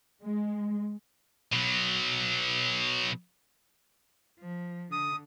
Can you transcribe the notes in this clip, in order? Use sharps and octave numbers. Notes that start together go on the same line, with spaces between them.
G#3
B2 F#3
F3
D3 D#6